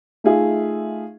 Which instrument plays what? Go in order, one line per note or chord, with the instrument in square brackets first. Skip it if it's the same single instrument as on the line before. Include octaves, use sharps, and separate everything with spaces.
[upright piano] A3 D#4 F4 G#4 E5